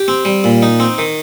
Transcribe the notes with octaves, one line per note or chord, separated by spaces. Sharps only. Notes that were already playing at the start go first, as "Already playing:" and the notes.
Already playing: G4
C4
G3
A#2
D#4
C4
D#3